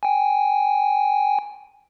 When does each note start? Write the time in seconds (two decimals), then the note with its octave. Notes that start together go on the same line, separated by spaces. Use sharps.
0.03 G5 G#5